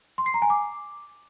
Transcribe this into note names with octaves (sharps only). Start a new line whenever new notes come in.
C6
C7
A#5
G#5
D6